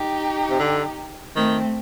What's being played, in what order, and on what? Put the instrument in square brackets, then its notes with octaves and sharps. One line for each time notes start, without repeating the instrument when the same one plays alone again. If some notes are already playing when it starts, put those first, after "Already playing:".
Already playing: [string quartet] D#4 G4
[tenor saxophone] C3
D3
[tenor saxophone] D#3 [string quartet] A3 C4